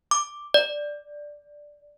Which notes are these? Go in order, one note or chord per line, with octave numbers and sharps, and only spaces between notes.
D6
D5